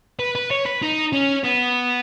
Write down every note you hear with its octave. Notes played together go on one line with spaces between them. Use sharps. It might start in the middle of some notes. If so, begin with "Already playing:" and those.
B4
B4
C#5
B4
D#4
C#4
B3